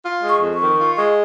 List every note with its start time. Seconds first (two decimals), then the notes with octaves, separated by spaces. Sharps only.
0.05 F4
0.23 G#3
0.29 C#6
0.42 F2
0.54 C#6
0.61 D#3
0.79 F4
0.98 G#3